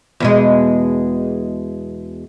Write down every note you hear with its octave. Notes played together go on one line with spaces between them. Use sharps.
E2 B2 G#3